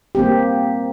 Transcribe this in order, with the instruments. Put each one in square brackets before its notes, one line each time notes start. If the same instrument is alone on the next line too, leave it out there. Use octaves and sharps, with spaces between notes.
[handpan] A#3 C4 G4